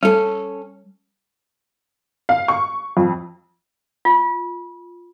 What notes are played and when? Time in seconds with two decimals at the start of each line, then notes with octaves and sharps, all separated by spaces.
0.03 G3 C#4 A4
2.29 F5
2.48 C#6
2.97 F2
4.05 F4